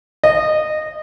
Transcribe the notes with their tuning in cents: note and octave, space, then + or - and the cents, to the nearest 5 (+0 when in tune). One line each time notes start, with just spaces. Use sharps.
D#5 -20